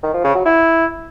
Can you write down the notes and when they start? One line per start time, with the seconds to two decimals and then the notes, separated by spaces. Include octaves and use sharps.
0.03 D#3
0.14 F3
0.24 C#3
0.35 F#3
0.45 E4